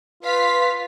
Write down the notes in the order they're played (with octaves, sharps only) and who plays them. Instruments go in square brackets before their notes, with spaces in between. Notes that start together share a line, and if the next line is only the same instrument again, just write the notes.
[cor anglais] F4 [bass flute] B4 [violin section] F5 B6